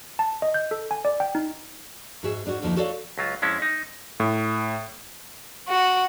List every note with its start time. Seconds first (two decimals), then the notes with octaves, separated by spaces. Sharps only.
0.19 A5
0.42 D#5
0.54 G6
0.71 A4
0.91 G#5
1.05 D5
1.20 G5
1.35 D#4
2.23 G#2 F#4 G#4 E5
2.46 G#2 D4 D#4 F#4
2.62 D2 F3 A#3 D#4
2.76 F#4 A4 C#5 D5 E5 F5
3.18 C#2 F#3 F4
3.42 F2 G#3 C#4 E4
3.62 D#4
4.20 A2
5.69 F#4